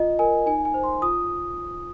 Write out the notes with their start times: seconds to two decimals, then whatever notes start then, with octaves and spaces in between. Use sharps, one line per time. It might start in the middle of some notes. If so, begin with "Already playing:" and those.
Already playing: F4 D#5
0.19 A#4 G#5
0.46 D#4 G#5
0.65 G#5
0.74 C5
0.84 C6
1.02 F4 D#6